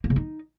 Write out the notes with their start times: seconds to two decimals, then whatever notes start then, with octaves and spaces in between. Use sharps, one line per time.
0.04 A#3
0.10 C#3
0.16 D#4